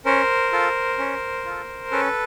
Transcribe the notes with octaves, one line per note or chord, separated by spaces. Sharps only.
C#4 A#4 C5
F4 A4
C#4
F4 A4
C#4 A4 B4